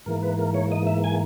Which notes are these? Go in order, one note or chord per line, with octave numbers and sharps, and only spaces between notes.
G#2 E3 A#3 A#4
B4
A#4
C#5
D#5
E5
G#5